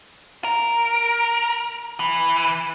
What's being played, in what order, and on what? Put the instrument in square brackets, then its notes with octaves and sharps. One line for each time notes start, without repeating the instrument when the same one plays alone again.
[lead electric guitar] A#4
E3